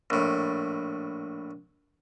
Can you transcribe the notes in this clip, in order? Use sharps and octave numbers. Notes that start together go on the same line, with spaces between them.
A#1 A2